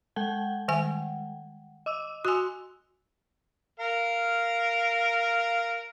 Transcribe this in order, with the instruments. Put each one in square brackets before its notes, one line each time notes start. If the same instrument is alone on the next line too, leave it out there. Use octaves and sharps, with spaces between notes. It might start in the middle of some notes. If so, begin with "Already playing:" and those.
[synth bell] G#3 F#5 G5
[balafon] D#3 G3 G#5
[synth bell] D#5 D6 E6
[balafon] F#4 G#5 [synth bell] C6 E6 F#6
[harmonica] A#4 F5